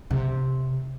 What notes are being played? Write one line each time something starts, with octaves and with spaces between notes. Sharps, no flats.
C3